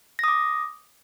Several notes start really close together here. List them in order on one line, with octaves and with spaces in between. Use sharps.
A#6 D#6 D6